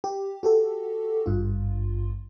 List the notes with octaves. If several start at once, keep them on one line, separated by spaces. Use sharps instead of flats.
G4
F#4 G4 A4
G#1 G2 F4